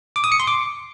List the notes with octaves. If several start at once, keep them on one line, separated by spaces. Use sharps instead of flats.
D6
D#6
C#7
C6
D6